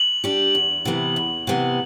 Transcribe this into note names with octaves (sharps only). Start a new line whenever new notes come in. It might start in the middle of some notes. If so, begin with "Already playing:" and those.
Already playing: F#7
G3 D4 G4
E2
C3 E3 B3
E2
C3 E3 B3